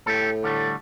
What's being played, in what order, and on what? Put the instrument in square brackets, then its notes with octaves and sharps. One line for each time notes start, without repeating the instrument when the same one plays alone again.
[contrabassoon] A2 [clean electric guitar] G4 A4
[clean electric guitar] D3 G3 A3